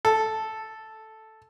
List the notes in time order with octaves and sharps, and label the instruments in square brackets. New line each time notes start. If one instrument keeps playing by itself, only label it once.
[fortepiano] A4